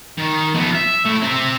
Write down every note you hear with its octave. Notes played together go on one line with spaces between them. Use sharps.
D#3
F3 B3
E5
A2 E4
C4 E5